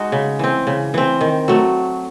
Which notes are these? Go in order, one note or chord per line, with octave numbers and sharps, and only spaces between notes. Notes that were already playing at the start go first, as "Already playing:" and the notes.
Already playing: G#3 D#4 F#4
C#3
E3 C4
C#3
E3 C4
D#3
F#3 A3